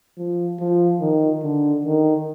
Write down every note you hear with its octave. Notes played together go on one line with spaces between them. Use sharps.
F3
F3
D#3
D3
D#3